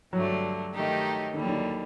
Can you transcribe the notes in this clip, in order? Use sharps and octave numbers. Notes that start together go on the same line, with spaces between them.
G2 D3 F#3 A3
D#3 A3 D#4 G4
D#2 D3 D#3 G3
F#3
D#3